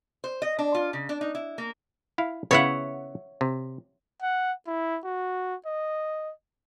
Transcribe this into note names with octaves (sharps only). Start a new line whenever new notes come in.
C5
D#5
D4
F4
C#3
D4
D#4
E4
A#3
E4 F5
C#3 B3 E4 C#5 E5 F#5
C3
F#5
E4
F#4
D#5